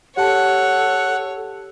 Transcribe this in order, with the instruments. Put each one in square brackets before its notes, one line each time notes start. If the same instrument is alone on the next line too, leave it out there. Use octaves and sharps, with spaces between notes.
[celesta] G4 A5 [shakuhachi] A4 [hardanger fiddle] C#5 [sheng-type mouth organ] F#5